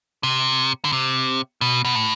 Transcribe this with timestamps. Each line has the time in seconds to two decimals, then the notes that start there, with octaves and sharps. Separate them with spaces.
0.23 C3
0.84 D3
0.92 C3
1.61 B2
1.85 B2
1.95 A2